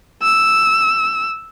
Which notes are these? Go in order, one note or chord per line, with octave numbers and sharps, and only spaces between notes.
E6